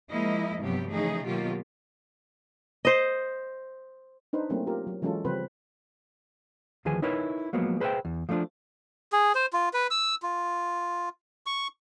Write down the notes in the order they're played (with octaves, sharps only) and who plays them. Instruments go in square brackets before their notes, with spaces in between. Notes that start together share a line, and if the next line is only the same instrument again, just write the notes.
[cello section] F3 G#3 A#3 E4 D#5
G2 C3 F3 F#3 B3 G4
C#3 E3 F3 A3 D#4 G#4
B2 D#3 F#3 A#3 F4 G4
[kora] C5 D#5
[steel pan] D4 D#4 B4 C5
F#3 A3 A#3 C4 C#4
F4 G4 A#4
F#3
E3 F#3 G#3 C#4 F4 A4
C#3 F3 G3 C4 B4 C5
[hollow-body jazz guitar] D2 D#3 F3 G#4 B4 G#5
D#4 E4 A#4 B4 C#5
F3 F#3 G#3 A#3 B3
G#4 B4 C5 D5 E5 G5
E2
F3 A3 B3 D4 F4
[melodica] G#4
C5
F4
B4
E6
F4
C#6